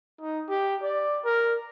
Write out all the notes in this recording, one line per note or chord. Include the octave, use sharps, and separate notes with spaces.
D#4
G4
D5
A#4